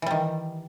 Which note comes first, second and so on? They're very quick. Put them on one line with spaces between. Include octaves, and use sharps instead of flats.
E3 G3 D#3